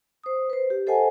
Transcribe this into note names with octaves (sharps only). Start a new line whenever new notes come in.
C5 D#6
B4 C5
G4
A4 C5 D#5 F#5 G#5 A5